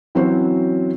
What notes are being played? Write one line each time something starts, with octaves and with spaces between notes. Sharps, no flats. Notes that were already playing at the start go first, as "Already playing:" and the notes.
E3 F#3 C4 C#4 F#4 C5